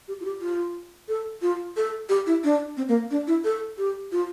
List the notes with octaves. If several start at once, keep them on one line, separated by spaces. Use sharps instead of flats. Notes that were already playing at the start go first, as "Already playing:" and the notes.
G4
F4
G4
F4
A4
F4
A4
G4
E4
D4
C4
A#3
D4
E4
A4
G4
F4